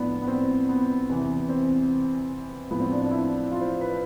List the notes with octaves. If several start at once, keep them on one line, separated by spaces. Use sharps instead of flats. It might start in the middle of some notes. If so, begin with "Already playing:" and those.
Already playing: A2 F3 B3 D4
B3
C4
B3
E2 C3 E3
C4
A2 F3 B3
C4
D4
D4
E4
F4
C5
B4